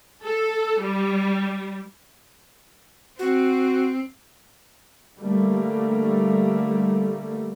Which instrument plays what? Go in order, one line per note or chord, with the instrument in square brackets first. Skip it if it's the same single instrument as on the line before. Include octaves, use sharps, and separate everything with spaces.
[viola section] A4
G3
[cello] C4 [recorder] F#4
[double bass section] D3 G3 A3 A#3